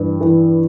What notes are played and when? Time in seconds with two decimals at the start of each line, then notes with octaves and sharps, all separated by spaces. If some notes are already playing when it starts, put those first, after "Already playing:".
Already playing: G2 E3
0.21 E3